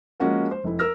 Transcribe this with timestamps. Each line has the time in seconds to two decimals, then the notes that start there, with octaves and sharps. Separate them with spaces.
0.20 F3 G#3 A#3 C#4 F#4 A#4
0.51 C5
0.64 F1 E4
0.79 A#4 E6 F6 A#6